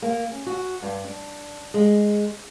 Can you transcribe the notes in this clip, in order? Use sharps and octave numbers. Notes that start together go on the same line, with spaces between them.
A#3
C#4
F#4
G2
D4
G#3